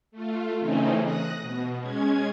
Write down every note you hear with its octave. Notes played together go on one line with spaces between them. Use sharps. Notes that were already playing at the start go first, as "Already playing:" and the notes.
A3 F4
C#3 E3 A3 C4 C#4 D#4
D#6 F#6 A#6
B2
G#3 C#4 G#6